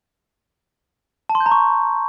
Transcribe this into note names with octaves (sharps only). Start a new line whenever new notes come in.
A5
C6
G6
A#5
C#6